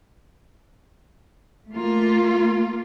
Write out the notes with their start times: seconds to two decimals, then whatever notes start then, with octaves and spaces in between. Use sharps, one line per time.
1.70 A3 A#3 F4